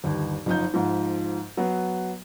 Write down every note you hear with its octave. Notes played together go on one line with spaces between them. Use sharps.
G1 D#2
F#1 F3 D#4 G6
G#2 F3
F#3 B3